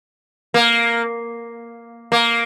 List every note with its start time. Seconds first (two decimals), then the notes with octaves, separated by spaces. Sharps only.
0.54 A#3
2.12 A#3